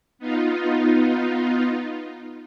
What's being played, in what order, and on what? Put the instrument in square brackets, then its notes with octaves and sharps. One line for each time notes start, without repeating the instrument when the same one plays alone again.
[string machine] B3 D#4 F4